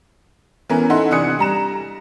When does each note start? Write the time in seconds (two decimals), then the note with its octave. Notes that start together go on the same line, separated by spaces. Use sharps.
0.69 E3 B3 C#4 A#4
0.90 D#4 E4 A4 F#5 C6
1.10 C3 E3 D4 D#6 F#6 C#7
1.39 G3 A#5 E7